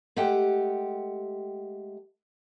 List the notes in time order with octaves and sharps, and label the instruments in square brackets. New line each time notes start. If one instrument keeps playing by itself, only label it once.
[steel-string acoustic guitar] G#3 A3 G4 F#5 G5